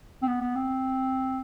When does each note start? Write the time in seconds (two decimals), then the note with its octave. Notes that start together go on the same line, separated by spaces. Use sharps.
0.23 C4
0.28 B3
0.41 B3
0.56 C4